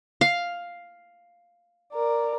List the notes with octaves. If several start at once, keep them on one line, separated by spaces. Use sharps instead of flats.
F5
A#4 D5